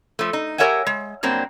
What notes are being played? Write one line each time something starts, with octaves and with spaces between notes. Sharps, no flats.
F3 A3
D#4
G4 A#4 C#5 E5 F#5 G#5
G#3
G2 F#3 A#3 C4